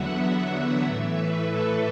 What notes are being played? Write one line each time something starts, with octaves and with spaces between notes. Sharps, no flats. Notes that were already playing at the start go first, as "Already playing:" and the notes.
Already playing: E2 D3 F#3 B3 E5 F#5
A2 E3 A3 E5
B4
A4